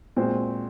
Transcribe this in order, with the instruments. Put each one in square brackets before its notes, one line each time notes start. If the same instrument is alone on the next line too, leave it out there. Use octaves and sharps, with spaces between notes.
[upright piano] A#2 G#3 C4 F#4 C5